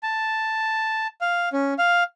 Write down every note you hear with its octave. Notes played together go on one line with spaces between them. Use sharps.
A5
F5
C#4
F5